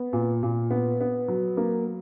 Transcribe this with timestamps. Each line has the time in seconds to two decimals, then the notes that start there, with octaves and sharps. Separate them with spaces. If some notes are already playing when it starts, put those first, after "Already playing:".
Already playing: B3
0.13 A#2
0.43 A#2
0.71 B3
1.01 B3
1.28 F#3
1.57 A#3